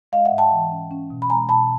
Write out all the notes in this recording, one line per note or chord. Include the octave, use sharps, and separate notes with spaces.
G#3 D#5 F5
E5 F#5
G#2
G5 A5
E3
C#4
C#4
B2
B5
G#3 G#5 A#5
B2 A5 B5